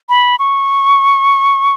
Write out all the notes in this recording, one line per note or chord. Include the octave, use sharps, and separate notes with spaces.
B5
C#6